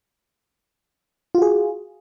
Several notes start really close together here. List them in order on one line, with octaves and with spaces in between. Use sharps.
F4 F#4 G#4